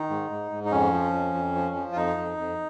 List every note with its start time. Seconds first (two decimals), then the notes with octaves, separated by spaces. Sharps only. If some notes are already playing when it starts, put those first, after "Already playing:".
Already playing: D#3 D#4
0.10 G#2
0.30 G#2
0.51 G#2
0.65 D#4
0.72 F2 C#4
0.93 F3
1.13 F2
1.34 F2
1.55 F3
1.76 F3
1.92 F4
1.96 F2 D#4
2.17 F2
2.37 F2